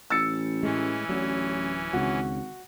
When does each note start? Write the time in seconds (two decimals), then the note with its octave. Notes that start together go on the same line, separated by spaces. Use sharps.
0.10 A1 E6 A6 C#7
0.63 A2 E3 G#3 C#4
1.09 D1 A1 F#3 D4
1.93 G#1 C#2 C#3 F#4